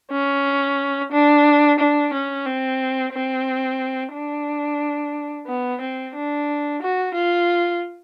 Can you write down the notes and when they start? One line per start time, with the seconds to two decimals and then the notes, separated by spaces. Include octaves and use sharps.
0.11 C#4
1.12 D4
1.79 D4
2.13 C#4
2.46 C4
3.13 C4
4.13 D4
5.47 B3
5.81 C4
6.15 D4
6.82 F#4
7.14 F4